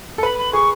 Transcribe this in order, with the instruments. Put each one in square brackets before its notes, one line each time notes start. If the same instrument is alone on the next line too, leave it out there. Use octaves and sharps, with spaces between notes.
[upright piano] A4
[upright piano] B4 [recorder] B5
[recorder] B5
[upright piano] G#4 [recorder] C#6